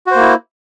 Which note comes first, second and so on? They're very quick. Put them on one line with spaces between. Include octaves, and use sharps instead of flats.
F#4 C5 A#3 E4